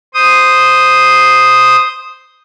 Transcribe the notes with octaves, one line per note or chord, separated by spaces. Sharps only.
C5 D#6